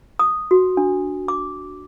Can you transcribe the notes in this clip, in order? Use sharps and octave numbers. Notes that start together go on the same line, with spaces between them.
D#6
F#4
D4
D6